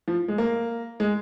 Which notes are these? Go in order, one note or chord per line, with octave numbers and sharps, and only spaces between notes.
F3
G#3
A#3
G#3